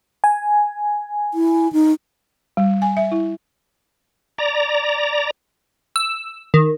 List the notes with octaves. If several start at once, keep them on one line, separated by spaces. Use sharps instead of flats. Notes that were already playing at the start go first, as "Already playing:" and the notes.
G#5
E4
D#4
G3
G#5
E5
E4
D5 A#5
E6
D#3